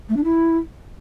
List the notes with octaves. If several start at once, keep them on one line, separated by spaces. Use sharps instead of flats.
A3
D4
E4